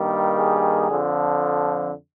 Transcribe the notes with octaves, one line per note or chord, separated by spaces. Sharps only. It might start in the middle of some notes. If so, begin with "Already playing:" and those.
Already playing: G2 D#3 G3 A#3
G#4
F2 D3 F3